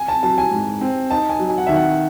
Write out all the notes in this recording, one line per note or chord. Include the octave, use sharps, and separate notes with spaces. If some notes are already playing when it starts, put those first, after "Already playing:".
Already playing: G#5
A5
F#3 A5
G#5
G#2
C4
D#4 A5
G#5
F#3
G#5
F#5
D#3 E5
F#5